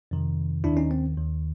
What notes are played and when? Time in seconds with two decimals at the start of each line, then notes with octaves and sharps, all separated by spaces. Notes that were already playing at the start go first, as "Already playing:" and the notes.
0.11 F2 C3 D#3
0.64 D#2 D#3 D4 E4
0.77 C#4 D#4
0.91 C4
1.17 D#2 D#3